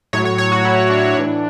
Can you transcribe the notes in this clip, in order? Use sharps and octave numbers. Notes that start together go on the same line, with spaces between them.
A2 F#3 C#5
C#5
C#5
F#4
E4
D4
A2 E3